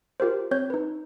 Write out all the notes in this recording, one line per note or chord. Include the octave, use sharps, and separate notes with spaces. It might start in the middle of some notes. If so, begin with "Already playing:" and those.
F4 G4 A#4 C5
C4 C#5 G6
D#4 B4